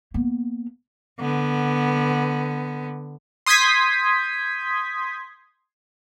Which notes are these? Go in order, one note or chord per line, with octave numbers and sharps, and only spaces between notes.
A#3 B3
D3 B3
C6 D#6 G6 G#6 B6